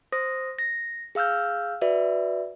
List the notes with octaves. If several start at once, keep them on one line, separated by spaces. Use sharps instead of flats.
C5 D#6 A#6
A#6
G#4 F5 E6 F6 G6
F#4 B4 D5 E5